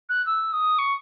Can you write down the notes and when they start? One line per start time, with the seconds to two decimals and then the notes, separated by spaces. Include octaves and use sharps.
0.09 F#6
0.26 E6
0.52 D#6
0.78 C#6